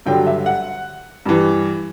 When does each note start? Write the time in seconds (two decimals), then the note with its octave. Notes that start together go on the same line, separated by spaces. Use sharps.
0.06 G2 D3 F#3 G5
0.27 E5
0.46 F#5
1.26 G2 E3